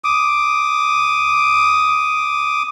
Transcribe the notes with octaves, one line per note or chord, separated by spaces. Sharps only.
D6 D#6